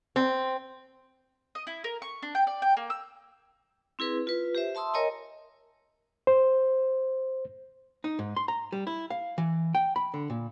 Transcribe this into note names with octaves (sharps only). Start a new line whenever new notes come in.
C4
D#5
E4
A#4
C#6
D4
G5
D5
G5
A#3
E6
C4 E4 G#4 B4
F4 B4
G4 C5 E5
E5 A5 C6 D#6 E6
A#4 C#5 D#5 G#5 A#5
C5
D#4
G#2
C6
A#5
G3
E4
F5
E3
G5
B5
D3
A#2